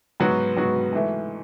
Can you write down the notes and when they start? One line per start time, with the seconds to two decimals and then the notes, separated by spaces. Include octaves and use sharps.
0.20 G#2 F#3 B3 F#4
0.57 G#2 F#3 B3 F#4
0.93 G#2 E3 A3